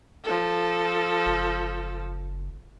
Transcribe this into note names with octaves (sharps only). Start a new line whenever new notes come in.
F3 A4
F#1